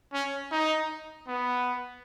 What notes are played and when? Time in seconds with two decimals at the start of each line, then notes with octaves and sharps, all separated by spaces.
0.13 C#4
0.52 D#4
1.28 B3